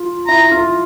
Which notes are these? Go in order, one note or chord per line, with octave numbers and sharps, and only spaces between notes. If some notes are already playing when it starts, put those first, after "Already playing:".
Already playing: F4
E4 A#5
F4